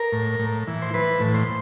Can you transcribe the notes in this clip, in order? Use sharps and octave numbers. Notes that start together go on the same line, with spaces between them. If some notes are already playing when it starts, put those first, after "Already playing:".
Already playing: A#4
A2
A2
E3
C5
E3 B4
A2
C5